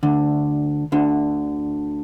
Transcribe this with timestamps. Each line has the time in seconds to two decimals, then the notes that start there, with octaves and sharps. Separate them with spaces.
0.03 D2 D3
0.92 D2 D3